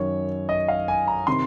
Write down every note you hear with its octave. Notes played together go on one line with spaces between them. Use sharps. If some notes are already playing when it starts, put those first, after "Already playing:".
Already playing: F#2 D#3 C#5
D#5
F5
G#5
A#5
C3 D#3 C6